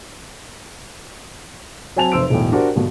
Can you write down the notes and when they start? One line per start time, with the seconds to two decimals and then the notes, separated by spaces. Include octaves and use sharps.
1.96 F#3 C4 G#5 A5 F7
2.12 F1 C5 E6 D7
2.30 E1 B1 A2
2.52 D4 F#4 G4 A#4 C5
2.76 G2 B2 D3